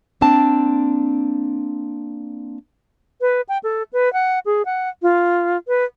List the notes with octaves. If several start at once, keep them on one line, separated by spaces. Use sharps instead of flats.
A#3 C4 D4 A5
B4
G5
A4
B4
F#5
G#4
F#5
F4
B4